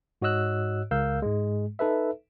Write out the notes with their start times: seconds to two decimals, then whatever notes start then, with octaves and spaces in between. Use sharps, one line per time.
0.22 G#2 F#4 C#5 D#5 E6 F#6
0.91 C#2 A#4 F5 E6 G6
1.22 G#2 G#3
1.79 D#4 A4 B4 E5